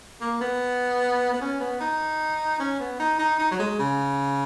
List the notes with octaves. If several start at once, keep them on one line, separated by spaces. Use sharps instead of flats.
A#3
B3
B3
C#4
B3
D#4
C#4
B3
D#4
D#4
D#4
F#3
G#3
C#3